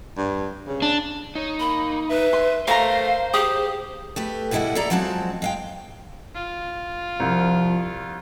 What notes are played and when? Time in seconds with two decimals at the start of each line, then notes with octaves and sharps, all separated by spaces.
0.17 G2
0.67 C#3
0.82 D4
1.35 D#4 C#5
1.60 A#3 B5
2.09 B4 E5
2.33 C6
2.68 A3 A#4 C5 F5 A#5
3.34 G4 G#4 D#6
4.16 A3 G4 B4
4.51 B2 G3 G#3 E4 D#5 F#5
4.75 E4 G#4 A4 D5 A#5
4.90 F3 F#3 G#3 C4 F#5 A5
5.42 G#3 F5 G5
6.34 F4
7.20 C2 F3